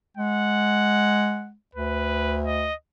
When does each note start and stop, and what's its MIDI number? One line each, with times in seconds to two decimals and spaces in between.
0.17 1.54 56
0.17 1.49 78
1.75 2.71 38
1.75 2.40 71
2.46 2.74 75